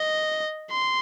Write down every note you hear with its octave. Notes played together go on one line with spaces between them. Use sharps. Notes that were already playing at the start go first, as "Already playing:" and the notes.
Already playing: D#5
C6